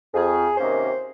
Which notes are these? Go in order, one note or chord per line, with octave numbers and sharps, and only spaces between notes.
F2 G#4
C3 D#3 A#3 C#4 C5